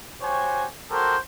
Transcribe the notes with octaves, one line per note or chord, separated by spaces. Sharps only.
F#4 G4 C5 C#5 G#5
F#4 G4 A4 A#4 C5